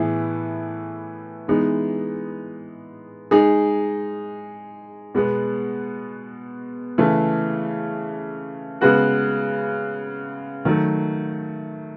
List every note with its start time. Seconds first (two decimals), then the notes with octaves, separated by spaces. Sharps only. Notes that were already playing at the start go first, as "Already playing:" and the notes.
Already playing: A2 E3 B3 E4 G#4
1.48 E3 G#3 B3 D#4
3.31 G#3 D#4 G#4
5.15 B2 G#3 B3
6.98 C#3 E3 A3
8.81 C#3 G#3 B3 F#4 B4
10.65 D#3 F#3 A3